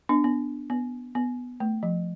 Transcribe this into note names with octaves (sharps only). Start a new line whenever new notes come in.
B3 D4
B3
B3
B3
A3
F3